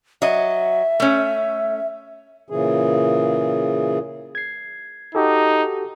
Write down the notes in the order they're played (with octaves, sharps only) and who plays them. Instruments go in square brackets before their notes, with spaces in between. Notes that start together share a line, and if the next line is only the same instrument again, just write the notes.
[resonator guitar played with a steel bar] F#3 D#5 [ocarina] E5
[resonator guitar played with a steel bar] A3 C#4
[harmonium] A#2 C#3 E3 G#4
[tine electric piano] G#6 C7
[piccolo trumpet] D#4 [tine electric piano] F#4 G4 A4